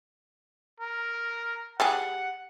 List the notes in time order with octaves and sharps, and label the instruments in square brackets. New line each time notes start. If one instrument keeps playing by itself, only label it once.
[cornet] A#4
[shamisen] G3 G4 G#4 [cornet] F#5